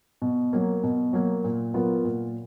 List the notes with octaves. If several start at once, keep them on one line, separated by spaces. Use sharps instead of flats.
B2
F#3 A#3
B2
F#3 A#3
A#2
F#3 B3 F4 A#4
A#2